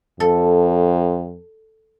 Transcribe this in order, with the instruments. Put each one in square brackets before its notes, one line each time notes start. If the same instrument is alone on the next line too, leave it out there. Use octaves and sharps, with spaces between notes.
[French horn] F2 [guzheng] A4